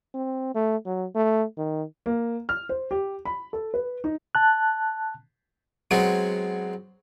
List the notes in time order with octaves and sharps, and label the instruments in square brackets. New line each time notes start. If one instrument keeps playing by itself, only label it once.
[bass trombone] C4
A3
F#3
A3
D#3
[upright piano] A#3
F6
C5
G4
B5
A4
B4
D#4
[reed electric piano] A5 F#6
[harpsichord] F#3 G#3 B3 C4